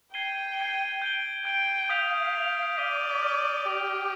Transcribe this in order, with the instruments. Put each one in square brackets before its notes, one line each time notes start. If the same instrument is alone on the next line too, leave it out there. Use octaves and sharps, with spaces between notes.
[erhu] G5 [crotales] G#6 C7 D#7 G7
[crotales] G#6 C7 D#7 G7
G6 D7 G7
[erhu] G5 [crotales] G6 D7 G7
[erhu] F5 [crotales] D#6 G6 B6 F7
[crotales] D#6 G6 B6 F7
[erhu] D5 [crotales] D6 F6 B6 D#7 G7
[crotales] D6 F6 B6 D#7 G7
[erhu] G4 [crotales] G6 D7 F7